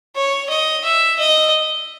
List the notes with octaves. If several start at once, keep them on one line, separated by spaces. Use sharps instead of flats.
C#5
D#5
E5
D#5